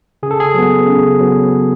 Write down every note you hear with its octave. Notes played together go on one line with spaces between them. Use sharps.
C#3 G#4
A4
G#4
F#3 B3
C#3
F#3 B3